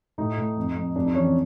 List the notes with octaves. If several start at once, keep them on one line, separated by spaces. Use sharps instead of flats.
A2 D#4
A2
F2
F2
F2 D4
D#4
E3 C#4
C4